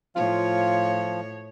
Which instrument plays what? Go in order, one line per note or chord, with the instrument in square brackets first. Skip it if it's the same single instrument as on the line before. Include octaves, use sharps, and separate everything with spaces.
[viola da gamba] A2 C#5 [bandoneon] F3 [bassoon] F4